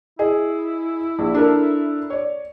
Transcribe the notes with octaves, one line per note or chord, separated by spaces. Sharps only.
E4 G#4 D#5
A#1
D4 A4 A#4
C#5 D5